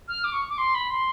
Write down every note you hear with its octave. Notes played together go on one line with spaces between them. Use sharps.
F6
D6
C#6
D6
C6
B5
C6